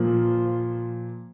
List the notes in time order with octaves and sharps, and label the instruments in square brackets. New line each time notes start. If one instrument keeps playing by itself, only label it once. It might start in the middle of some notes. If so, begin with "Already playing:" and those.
Already playing: [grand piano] A#2 A#3 [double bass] F3